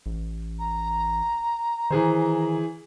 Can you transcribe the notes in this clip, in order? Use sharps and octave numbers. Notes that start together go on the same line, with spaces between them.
A1
A#5
D#3 E3 G#4 C5